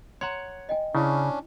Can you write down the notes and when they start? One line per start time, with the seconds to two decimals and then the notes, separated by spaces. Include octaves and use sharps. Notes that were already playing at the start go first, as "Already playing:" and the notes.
0.21 C#5 F#5 A#5 C6
0.69 D#5 G5 G#5
0.95 C#3 C#4 D4 E4